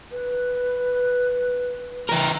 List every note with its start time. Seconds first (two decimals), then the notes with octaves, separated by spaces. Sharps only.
0.11 B4
2.09 E3 A#4